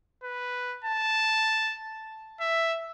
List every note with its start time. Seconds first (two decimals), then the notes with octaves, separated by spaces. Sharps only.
0.23 B4
0.84 A5
2.40 E5